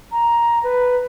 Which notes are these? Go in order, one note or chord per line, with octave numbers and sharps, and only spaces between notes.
A#5
B4